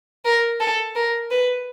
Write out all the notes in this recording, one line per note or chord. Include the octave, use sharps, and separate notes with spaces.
A#4
A4
A#4
B4